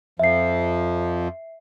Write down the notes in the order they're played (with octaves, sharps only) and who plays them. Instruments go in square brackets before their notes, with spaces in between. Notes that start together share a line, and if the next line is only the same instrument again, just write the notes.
[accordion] F2 F3 [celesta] E5 C7